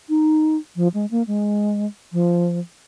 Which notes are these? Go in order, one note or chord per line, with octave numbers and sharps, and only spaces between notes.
D#4
F3
G#3
A#3
G#3
F3